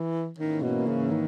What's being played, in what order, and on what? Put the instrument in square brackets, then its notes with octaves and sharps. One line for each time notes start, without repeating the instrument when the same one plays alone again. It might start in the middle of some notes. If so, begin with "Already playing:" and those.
Already playing: [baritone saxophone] E3
[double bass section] G#2 E3 A#3 C#4 [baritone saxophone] D#3
[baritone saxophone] B2
C#3
D#3